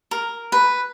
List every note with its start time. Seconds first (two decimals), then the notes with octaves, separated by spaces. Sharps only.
0.11 A#4
0.52 B4